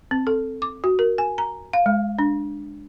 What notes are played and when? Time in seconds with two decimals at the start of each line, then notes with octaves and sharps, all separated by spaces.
0.11 C4
0.27 A4
0.62 D6
0.84 F#4
0.99 A#4
1.18 G#5
1.38 A#5
1.73 F5
1.86 G#3
2.19 D4